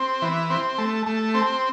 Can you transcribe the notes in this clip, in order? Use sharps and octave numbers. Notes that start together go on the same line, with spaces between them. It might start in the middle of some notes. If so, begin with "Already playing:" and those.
Already playing: C4
E3
C4
A3
A3
C4